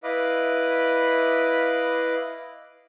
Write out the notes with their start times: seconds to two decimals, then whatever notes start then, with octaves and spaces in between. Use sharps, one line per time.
0.03 E4 B4 D#5 F5 B5 D6